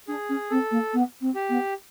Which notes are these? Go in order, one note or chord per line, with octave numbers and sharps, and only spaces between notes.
D4 G#4
C#4
C4 A4
A#3
B3
C4
G4
B3